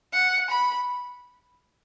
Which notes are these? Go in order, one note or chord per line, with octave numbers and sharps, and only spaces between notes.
F#5
B5